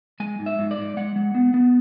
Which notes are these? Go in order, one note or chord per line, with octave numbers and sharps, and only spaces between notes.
G#3 G#5
G#2
E5
G#2
D5
G#2
G#3 F#5
G#3
B3
B3